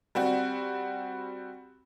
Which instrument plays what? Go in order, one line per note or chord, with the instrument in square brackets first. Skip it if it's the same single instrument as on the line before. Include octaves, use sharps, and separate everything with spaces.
[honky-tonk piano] G3 C4 F#4